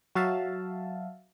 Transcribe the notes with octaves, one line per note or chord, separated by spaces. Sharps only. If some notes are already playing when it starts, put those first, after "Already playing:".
F#3 F#4 E5 F5 A5